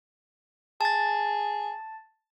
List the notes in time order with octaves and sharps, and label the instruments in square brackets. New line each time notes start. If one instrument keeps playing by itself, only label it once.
[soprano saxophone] G#4 [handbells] A5 A6